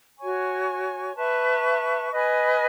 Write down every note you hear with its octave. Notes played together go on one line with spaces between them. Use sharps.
F#4 C#5 G#5 C#6
B4 E5 A5 C#6
B4 D#5 G#5 B5